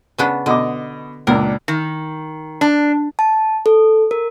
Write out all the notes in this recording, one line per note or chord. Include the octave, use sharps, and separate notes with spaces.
C#3 B3 D4
B2 D3 D#5 D6
C#2 A#2 D4 A#4
D#3
D4
A5
A4
A#4